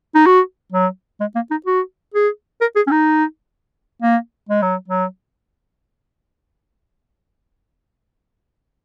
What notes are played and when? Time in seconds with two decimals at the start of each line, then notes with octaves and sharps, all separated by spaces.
0.15 D#4
0.26 F#4
0.72 F#3
1.20 G#3
1.35 A#3
1.51 D#4
1.66 F#4
2.14 G#4
2.61 A#4
2.76 G#4
2.87 C#4
2.91 D#4
4.02 A#3
4.49 G#3
4.62 F#3
4.88 F#3